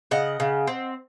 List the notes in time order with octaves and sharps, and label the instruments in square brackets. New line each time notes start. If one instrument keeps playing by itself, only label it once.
[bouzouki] C#3 D#5 F#5
C#3
C4